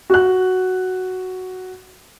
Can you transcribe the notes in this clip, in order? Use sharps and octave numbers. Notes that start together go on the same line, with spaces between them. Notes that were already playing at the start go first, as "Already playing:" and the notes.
F#4 F#6